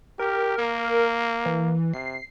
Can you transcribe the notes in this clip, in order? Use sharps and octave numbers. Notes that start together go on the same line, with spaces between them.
G4 A#4
A#3
E3
C3 C7